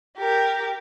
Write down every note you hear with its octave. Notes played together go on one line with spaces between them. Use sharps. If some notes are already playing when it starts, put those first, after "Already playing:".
G4 A#4